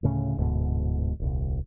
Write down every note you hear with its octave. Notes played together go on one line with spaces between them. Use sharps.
D2 A2 C#3
D1 D2 G#2 B2
D#1 C2